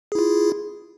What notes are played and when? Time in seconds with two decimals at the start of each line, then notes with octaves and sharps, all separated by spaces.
0.12 G#4
0.15 E4
0.19 F4